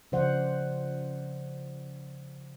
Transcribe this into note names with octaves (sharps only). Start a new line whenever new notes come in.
C#3 F3 C5 D5 F#5